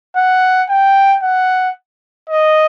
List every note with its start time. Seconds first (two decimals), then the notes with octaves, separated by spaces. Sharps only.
0.16 F#5
0.69 G5
1.22 F#5
2.29 D#5